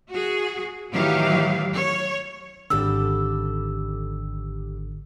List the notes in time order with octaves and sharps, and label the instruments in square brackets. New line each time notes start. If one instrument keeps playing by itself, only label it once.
[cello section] F#4 G#4
A2 D#3 E3 F#3 G4 F5
C#5
[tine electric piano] G#1 D3 [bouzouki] G3 G4 A4 [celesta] E6